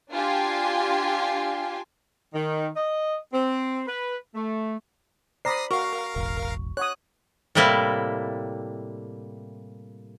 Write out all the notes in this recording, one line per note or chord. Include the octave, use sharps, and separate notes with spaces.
D4 F4 G4 G#5 C6
D#3
D#5
C4
B4
A3
C5 D5 A#5 B5 D#6 A#6 C7
F#4 A#4 F5 C#6
E1 A1
C#5 F#5 D#6 F#6
A2 C3 G3 A#3 E4